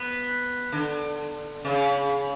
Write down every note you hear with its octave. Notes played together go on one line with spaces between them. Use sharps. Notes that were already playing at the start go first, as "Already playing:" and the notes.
Already playing: B3
D3
C#3